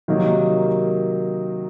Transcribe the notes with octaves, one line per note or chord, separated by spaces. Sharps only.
C3 D#3 F#3 A#3 D#4